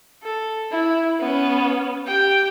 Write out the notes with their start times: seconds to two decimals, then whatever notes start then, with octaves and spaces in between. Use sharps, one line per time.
0.23 A4
0.71 E4
1.20 B3 C#4
2.06 G4 G5